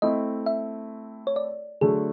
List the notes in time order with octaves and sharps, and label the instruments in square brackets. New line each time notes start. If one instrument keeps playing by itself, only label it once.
[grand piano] A3 C4 E4 [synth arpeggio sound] D#5
[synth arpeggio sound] E5
C#5
D5
[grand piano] D3 F#3 A3 [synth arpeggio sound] G#4